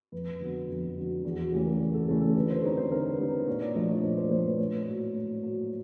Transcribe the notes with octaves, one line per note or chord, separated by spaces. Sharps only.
F2 B4
D3 F#3 B3
F2
D3 F#3 B3
E2 F#4
F#4
C#3 E3 A3 C#4 G4
A#4
E2
A4
C#3 E3 A3 C#4 A4
A4
D3 B4
C5
G3 C4 D#4 C#5
C5
D3 A#4
B4
G3 C4 D#4
B4
A#2 C#5
D5
F3 A3 D4 D#5
C#5
A#2 C5
C5
F3 A3 D4 C5
B4
A2 C#5
F#3 A#3
A2
F#3 A#3